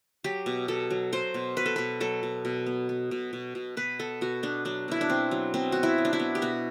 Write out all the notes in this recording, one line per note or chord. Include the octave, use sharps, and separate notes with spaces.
F#3 G4
B2
B2 A4
F#3
F#3 C5
B2
B2 B4
A4
B2 B4
F#3 A4
B2
B2
B3
B3
B2
B2
B2
B2 B4
B3 A4
B2 F#4
B3 D4
F#3 D4
B2 E4
D4
B2 C4
F#3
B2 C4
B3 F#4
E4
F#3
D4
E4
B3
G4
B2 F#4